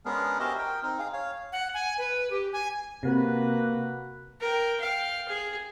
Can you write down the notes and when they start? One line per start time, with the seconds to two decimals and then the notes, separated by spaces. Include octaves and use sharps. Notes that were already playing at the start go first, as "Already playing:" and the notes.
0.05 G#3 B3 C#4 D4 G#4 A#4
0.40 F#4 G4 A#4 C5 D#5 E5
0.59 A#4 G5
0.83 C4 D#4
0.99 G#4 F5
1.13 C#5 F5
1.52 F#5
1.74 G#5
1.98 B4
2.31 G4
2.53 G#5
3.03 C3 A#3 F#4 B4
4.40 A#4 G5
4.80 F5 G5
5.28 G#4